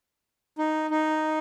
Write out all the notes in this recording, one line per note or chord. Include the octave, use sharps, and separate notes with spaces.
D#4
D#4